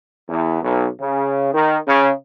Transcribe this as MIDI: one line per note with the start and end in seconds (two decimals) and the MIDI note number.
0.29 0.61 40
0.62 0.85 35
1.00 1.53 49
1.53 1.76 51
1.88 2.12 49